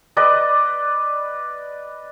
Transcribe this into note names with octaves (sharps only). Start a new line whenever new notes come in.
B4 D5 D#5